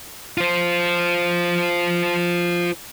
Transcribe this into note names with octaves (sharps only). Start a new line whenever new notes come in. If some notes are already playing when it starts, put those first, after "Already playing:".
F4 C5